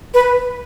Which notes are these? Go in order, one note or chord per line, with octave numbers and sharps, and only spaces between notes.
B4